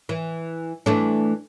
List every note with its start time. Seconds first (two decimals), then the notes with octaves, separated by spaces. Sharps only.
0.09 E3
0.86 E3 A3 D4